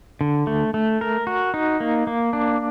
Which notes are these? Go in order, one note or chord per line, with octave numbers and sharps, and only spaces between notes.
D3
A3
A3
A#4
F#4
D#4
A#3
A#3
D4